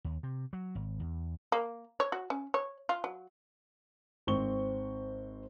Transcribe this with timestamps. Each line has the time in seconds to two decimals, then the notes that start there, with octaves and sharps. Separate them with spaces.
0.04 D#2
0.23 C3
0.53 F#3
0.75 G#1
1.00 E2
1.52 A#3
2.00 C#5
2.12 F#4
2.30 C#4
2.54 C#5
2.89 F4
3.04 F#3
4.27 G#1 C4 C#6 G7